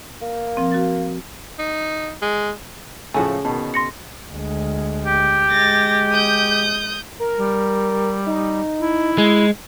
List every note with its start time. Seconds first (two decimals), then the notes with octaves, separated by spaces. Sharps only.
0.22 A#3
0.57 F3 C4
0.72 F#4 A6
1.59 D#4
2.22 G#3
3.14 A2 C#3 F3 A3 F#4 G#5
3.45 B2 D#3 A5
3.74 C6 A#6 C#7
4.31 D2 G#3
5.06 G4
5.50 G#3 A6 A#6
6.12 D#6 G6
7.20 A#4
7.38 G3
8.26 D#4
8.80 E4
9.18 G#3